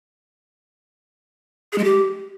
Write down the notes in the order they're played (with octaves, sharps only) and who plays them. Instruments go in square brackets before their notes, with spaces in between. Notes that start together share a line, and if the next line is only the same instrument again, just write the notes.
[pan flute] G#4
G#3
G4